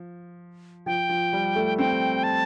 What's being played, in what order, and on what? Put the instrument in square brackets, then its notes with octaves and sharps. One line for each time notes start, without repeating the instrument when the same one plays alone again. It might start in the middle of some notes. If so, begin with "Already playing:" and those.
Already playing: [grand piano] F3
[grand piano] F3 [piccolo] G5
[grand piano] F3
G3
A3
[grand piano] C4 [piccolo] G5
[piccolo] A5